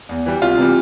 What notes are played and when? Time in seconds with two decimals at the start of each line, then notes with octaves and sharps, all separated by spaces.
0.09 E2
0.26 E3 G3
0.42 C2 F4
0.58 C3 E3 G3